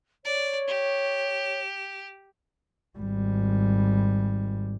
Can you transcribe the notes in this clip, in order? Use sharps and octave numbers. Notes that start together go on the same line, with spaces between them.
C#5 D5
G4
G#1 G3